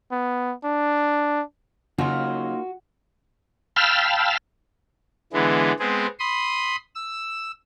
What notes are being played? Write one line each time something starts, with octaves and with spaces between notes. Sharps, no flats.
B3
D4
C#3 F#3 A#3 D#4 F4 F#4
F5 G5 A5 B5 E6 F6
D3 E3 G#3 B3
G#3 B3 C4 G#4
B5 C6 D#6
E6